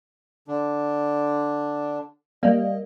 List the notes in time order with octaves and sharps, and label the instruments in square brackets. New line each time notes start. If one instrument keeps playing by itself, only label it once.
[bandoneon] D3 D4
[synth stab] G3 A#3 [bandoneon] D#5